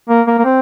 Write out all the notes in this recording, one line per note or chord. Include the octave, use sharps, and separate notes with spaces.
A#3
A#3
A#3
C4